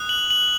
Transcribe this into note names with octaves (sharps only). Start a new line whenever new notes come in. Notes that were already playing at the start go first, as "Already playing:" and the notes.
Already playing: D#6 F#6
F#7
F#7